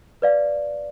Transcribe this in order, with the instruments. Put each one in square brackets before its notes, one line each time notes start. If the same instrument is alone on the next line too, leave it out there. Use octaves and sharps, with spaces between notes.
[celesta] B4 D5 F5